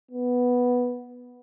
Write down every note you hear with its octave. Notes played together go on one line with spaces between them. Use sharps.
B3